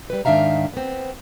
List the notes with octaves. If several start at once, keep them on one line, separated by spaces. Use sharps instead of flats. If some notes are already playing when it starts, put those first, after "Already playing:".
G3 B4
G#2 D#3 D4 E5 F5 A#5
B3 C4